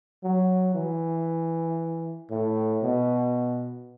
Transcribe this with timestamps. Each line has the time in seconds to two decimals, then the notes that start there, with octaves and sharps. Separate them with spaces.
0.24 F#3
0.74 E3
2.31 A2
2.83 B2